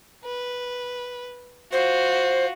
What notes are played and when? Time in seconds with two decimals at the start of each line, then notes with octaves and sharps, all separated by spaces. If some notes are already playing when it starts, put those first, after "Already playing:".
0.24 B4
1.72 F4 F#4 C5